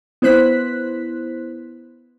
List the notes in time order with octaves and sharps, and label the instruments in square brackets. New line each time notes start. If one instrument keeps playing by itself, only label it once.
[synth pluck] B3 E4 C5 F#6 B6